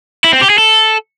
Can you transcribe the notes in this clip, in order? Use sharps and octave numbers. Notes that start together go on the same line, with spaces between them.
E4
C4
G4
G#4
A4